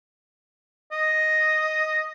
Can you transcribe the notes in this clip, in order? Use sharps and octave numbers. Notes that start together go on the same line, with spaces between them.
D#5